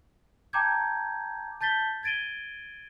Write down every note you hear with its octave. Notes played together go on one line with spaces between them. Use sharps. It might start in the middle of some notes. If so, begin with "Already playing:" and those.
G5 A5 A#5 D6 G6 G#6
A5 G6 A6 B6 G7
G#6 A6 D7 D#7 G7